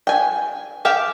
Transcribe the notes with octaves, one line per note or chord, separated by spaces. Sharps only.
G5 G#5
G4 E5 F5 G5